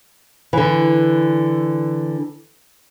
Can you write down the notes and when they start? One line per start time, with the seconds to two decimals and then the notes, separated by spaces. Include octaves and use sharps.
0.53 D3 E3